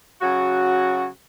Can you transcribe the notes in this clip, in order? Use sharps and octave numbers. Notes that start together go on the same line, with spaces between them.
C#3 F#3 F#4